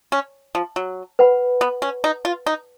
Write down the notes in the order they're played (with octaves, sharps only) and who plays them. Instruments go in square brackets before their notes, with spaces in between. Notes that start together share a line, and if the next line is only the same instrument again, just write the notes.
[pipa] C#4
F3
F#3
[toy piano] B4 F#5 B5
[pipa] B3
C#4
D#4
F4
D#4